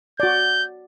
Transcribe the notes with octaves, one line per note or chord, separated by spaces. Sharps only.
F#4 D5 G6